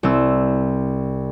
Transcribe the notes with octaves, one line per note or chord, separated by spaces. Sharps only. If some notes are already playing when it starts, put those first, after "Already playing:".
C2 C4 E6